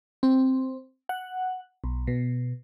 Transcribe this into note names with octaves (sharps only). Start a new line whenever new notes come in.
C4
F#5
B1
B2